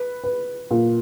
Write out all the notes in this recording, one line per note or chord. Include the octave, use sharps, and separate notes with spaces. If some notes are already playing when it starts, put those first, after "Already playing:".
Already playing: B4
B4
A#2